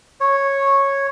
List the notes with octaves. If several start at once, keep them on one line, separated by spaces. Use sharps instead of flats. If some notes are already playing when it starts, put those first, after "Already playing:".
C#5